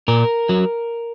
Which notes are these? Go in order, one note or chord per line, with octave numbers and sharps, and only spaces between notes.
A#2 A#4
F#3